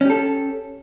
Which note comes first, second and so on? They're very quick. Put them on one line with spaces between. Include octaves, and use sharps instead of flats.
C#4 G4 A4